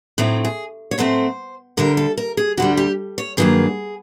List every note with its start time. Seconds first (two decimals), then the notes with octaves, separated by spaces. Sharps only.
0.18 A2 F#3 A3 C4 D#4
0.45 G#4
0.91 C#5
0.98 A2 F#3 A3 C4 C5
1.77 D2 D3 G3 A#4
1.97 A4
2.17 A#4
2.37 G#4
2.57 D2 D3 G3 F#4
2.77 G4
3.18 C#5
3.37 G2 D#3 F#3 A#3 G#4